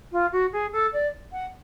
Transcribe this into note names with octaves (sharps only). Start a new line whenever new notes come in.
F4
F#4
G#4
A4
D5
F#5